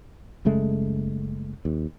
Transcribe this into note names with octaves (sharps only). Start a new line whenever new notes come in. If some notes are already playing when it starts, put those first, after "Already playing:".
F#1 C#3 G#3 A3
D#2